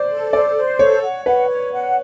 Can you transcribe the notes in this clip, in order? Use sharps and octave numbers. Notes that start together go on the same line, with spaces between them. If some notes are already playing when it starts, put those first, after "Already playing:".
Already playing: C5 D5
A4
C5 D5
C5
A4 C#5
F#5
B4 F#5
C#5
F#5